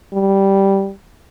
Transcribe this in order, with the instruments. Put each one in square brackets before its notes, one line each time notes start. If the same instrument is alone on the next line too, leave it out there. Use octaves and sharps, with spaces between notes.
[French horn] G3